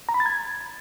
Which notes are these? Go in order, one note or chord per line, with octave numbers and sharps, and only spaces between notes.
A#5
B5
A6
G#6